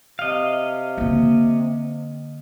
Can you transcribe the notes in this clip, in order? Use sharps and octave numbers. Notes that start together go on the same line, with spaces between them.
C3 D#5 F5
D3 A#3